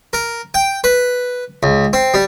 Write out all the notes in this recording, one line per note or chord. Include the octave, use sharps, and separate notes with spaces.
A#4
G5
B4
C#2
C4
G3